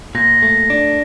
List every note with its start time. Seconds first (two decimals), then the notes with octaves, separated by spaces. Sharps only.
0.15 A#2 A#6
0.42 A3
0.70 D4